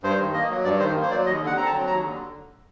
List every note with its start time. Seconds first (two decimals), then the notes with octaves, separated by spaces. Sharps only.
0.03 G2 C5
0.19 D#3
0.34 A#3 D#5
0.50 F#3
0.64 G2 D5
0.79 D#3 C5
0.95 A#3
1.02 C5
1.10 F#3 D5
1.26 D#2 D#5
1.42 D3 F#5
1.56 C4 A#5
1.66 A5
1.73 F#3
1.87 D#2 A#5
2.02 D3